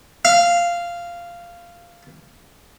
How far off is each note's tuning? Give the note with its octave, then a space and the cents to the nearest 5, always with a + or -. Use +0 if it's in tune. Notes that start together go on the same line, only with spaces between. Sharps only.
F5 -10